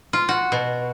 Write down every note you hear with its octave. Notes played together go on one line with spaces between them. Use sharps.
F4
F#4
B2